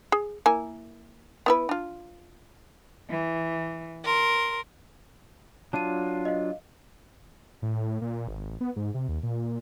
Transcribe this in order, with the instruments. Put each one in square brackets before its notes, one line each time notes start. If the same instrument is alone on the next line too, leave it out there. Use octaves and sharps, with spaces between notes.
[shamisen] G#4
A#3 E4 G#5
B3 E4 B4
D4 F4
[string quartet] E3
A#4 C6
[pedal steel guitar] F#3 D4 F4 [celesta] A5 D#7
[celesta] D#5 F5
[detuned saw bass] A2
A#2
G#1
A1
B3
G#2
C3
D#2
A#2